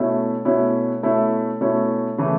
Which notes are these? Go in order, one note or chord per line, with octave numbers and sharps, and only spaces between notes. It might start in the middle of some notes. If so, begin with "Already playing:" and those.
Already playing: B2 A3 C#4 E4
B2 A3 C#4 E4
B2 A3 C#4 E4
B2 A3 C#4 E4
C#3 E3 A3 E4